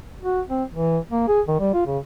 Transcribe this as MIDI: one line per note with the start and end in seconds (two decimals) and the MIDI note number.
0.22 0.41 66
0.48 0.64 60
0.73 0.98 52
1.11 1.24 58
1.28 1.41 68
1.48 1.56 51
1.60 1.73 55
1.74 1.86 65
1.86 1.99 49